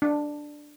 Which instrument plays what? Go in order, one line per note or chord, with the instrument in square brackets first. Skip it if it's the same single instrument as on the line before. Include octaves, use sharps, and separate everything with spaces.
[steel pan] D4